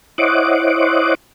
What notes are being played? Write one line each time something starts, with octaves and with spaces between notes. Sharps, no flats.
E4 C5 C#5 D#5 F#5 D6